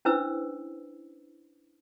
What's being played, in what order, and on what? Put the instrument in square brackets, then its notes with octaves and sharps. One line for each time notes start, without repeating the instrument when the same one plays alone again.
[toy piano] C#4 D4 E4 B4 C5 E6